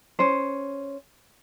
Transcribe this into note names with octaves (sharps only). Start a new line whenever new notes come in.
C#4 C5